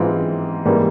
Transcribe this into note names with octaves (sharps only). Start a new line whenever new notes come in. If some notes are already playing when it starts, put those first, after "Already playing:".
Already playing: G#2 E3 G#3 C4 F4
G#2 E3 G3 A#3